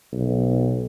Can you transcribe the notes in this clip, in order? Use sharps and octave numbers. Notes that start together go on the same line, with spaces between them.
B1